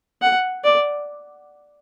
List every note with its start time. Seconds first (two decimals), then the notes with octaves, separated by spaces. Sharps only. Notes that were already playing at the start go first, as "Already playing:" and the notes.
0.22 F#5
0.64 D5